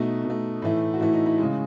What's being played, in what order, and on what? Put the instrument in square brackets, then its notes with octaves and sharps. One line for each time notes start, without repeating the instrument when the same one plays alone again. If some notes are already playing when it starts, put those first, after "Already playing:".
Already playing: [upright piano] B2 A3 D#4
B2
A3
A2 E3 A3
F#4
A2 E3 A3 E4
D#4
E4
C#3 G#3